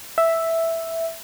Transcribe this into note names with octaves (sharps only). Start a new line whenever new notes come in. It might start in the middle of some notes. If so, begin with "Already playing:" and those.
E5